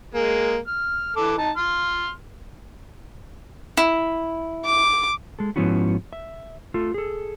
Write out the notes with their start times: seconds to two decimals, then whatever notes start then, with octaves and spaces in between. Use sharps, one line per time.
0.14 G#3 A#3 G#4
0.67 F6
1.17 E3 A4 D6
1.38 D#4 A5
1.57 C6 F6
3.77 E4
4.65 D6
5.39 G#3 A4
5.56 G#2 F3 B3 C#4 E4 F#4
6.13 E5
6.74 A3 F4 A4
6.94 G#4 A4